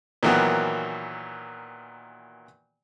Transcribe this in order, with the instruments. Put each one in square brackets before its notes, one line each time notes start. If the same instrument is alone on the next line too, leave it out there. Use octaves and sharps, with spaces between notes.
[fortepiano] A#2 D#3 E3 F#3 B3